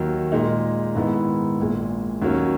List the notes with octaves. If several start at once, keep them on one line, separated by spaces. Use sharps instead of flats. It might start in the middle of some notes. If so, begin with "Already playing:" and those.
Already playing: D#2 D#3 F#3
A#2 G#3 D#4
G#2 D#3 G#3 B3 E4
A#1 A#2 G#3
D#2 D#3 F#3 C#4